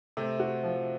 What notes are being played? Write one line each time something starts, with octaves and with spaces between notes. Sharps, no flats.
C3 A3 C4
F#4
F3